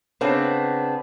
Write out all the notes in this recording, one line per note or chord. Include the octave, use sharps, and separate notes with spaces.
C#3 B3 C4 D4